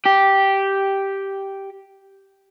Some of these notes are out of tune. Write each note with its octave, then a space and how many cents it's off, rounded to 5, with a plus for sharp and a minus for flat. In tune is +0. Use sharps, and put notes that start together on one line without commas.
G4 -5